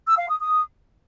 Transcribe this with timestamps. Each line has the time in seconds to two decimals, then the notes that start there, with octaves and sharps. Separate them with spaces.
0.07 E6
0.18 F5
0.29 D#6
0.40 D#6